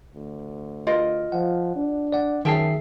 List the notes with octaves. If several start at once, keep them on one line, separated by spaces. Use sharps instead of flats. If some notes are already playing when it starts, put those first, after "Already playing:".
D2
F4 A#4 D#5
F3 F#5
D4
D5 F#5
F#2 D#3 G#4 E5 G5 A5 C7